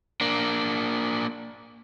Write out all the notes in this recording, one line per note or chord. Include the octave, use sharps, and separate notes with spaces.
A#3 D4